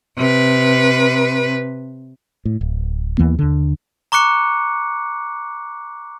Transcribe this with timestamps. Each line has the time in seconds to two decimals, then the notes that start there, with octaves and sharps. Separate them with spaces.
0.17 C3 B4
2.45 A2
2.61 D1
3.18 D#2 E3 A#3 B3
3.39 D#2 D3
4.12 A#5 C#6 D6 F#6 C#7